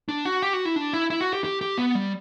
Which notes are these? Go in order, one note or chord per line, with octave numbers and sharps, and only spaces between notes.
D4
F#4
G4
F#4
E4
D4
E4
E4
F#4
G4
G4
G4
B3
G3